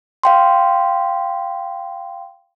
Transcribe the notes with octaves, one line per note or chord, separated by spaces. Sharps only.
F5 G5 C6